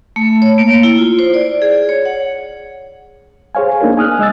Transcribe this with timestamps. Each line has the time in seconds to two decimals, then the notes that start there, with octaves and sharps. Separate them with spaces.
0.16 A3
0.42 C#5
0.58 A#3
0.83 E4
0.98 F4
1.19 C5
1.34 D5
1.62 G#4
1.89 C#5
2.05 F#5
3.55 G#4 C5 C#5 F5 G#5
3.81 A#3 D4 D#4 G#4 A#4
3.97 G#5 D#6 F6 F#6
4.19 G#3 D#5 E6 A6